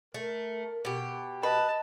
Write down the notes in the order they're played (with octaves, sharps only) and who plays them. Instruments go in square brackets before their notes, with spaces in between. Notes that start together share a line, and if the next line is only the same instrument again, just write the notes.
[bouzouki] A3 [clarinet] A#4
[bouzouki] B2 G4
[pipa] B4 [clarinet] D#5 [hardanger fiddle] A5